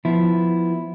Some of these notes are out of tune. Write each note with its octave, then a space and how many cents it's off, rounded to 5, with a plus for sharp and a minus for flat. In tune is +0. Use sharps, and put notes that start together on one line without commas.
F3 +0 B3 +0 E4 +0